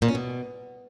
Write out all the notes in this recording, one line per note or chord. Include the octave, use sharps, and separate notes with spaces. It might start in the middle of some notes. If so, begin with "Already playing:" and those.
A#2
C#4
B2